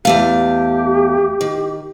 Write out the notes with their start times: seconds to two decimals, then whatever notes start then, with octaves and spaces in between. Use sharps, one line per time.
0.05 E2 A3 G4 F5
1.41 D#3